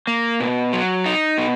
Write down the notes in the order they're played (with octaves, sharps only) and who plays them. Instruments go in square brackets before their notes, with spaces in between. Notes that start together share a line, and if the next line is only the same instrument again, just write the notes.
[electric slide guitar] A#3
B2
F#3
D#4
B2